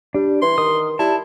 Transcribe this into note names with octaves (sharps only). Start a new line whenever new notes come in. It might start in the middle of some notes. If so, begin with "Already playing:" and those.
G3 D4
E3 C6
D#3 D#6
G3 E4 A5